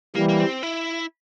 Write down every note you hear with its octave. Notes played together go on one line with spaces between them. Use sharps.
E3 G3 A#3
A#3
C4
E4